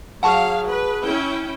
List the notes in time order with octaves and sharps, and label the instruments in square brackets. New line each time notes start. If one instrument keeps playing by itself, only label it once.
[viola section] F#3 F5 [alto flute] G#4 [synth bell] F#5 A5 C#6
[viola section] B4
C#4 E4 G5